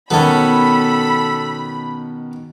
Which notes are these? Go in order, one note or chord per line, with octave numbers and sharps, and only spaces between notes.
B2 D#3 B3 C#4 A4 A5 B5